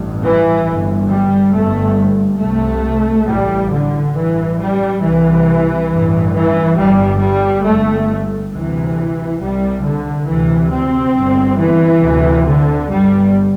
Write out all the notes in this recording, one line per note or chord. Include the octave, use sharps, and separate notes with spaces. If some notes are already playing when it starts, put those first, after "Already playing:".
Already playing: A1 G2
E3
G1 G2
G3
G1 G2 A3
C2 C3 A3
A1 A2 G3
D3
A1 G2 E3
G3
C2 C3 E3
A1 G2
E3
G1 G2 G3
G3
G1 G2 A3
D2 C3 E3
C2 C3 G3
D3
D2 C3 E3
C4
G1 G2
E3
D2 C3
D3
G1 G2 G3